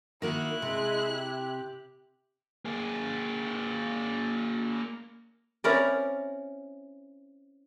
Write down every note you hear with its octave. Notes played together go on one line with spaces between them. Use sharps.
D#3 A#3 E4 F#4 F#6
C3 G#3
G4
A#3 G#4
C4 C#4 E4 A#4 C#5 D5